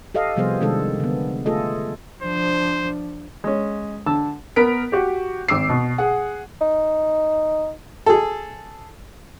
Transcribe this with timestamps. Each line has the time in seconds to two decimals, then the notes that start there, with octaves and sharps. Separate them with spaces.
0.15 G4 A4 D#5 F5
0.36 C3 F3 G3 B3 G#4 C5
0.61 C3 D#3 G#3 D4 A4
1.00 D3 B3
1.46 A3 F4 G#4 A4 D#5
2.23 F3 D4 C5
3.44 G#3 C#4
4.06 D3 A5 E6
4.56 B3 A#4 B6 D7
4.92 F#4 G4
5.48 G#1 D6 E6 C7
5.69 B2
5.98 G#4 F#5
6.61 D#4
8.06 G#4 A4